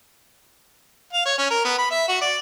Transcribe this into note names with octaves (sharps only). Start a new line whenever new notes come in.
F5
C#5
C#4
A#4
B3
B5
E5
F#4
D5